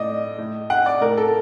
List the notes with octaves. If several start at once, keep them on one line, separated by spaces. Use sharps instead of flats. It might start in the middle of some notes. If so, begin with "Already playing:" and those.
Already playing: A2 D5 D#5
A2
F#5
D5
A2 A#4
A4